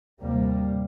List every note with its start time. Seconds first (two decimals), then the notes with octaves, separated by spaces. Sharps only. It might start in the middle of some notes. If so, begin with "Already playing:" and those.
0.22 D#2 A2 C3 G3 A#3